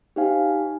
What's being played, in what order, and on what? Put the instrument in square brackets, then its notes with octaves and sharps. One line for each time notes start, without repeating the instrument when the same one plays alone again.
[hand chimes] D#4 G4 C5 F5 G#5